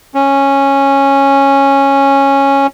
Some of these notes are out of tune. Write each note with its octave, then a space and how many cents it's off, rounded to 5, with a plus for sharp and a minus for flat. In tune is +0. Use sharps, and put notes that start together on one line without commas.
C#4 -10